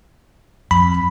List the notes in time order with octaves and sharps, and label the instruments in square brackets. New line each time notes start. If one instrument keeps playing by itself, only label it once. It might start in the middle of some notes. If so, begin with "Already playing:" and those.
[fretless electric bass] F2 [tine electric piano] B5